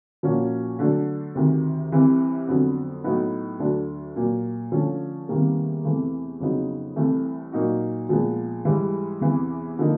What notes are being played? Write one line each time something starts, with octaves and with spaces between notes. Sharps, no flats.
A#2 F3 A#3 C#4 F#4
D3 F#3 A3 D4
D2 C3 D#3
C2 C3 E3
F2 D3 F#3 B3
A2 F#3 B3 D#4
D2 D3 F#3 A3 D4
A#2 F#3 A#3
D3 F3 A3 C#4
E2 C3 D#3 G3 A#3
E2 C3 E3 A3
F2 C#3 F#3 B3 D#4
C2 C3 E3 A3
A#2 F#3 A#3 D#4 F#4
A#2 F3 G#3 B3
G#2 E3 G3
E2 C3 E3
D3 F3 A#3 D#4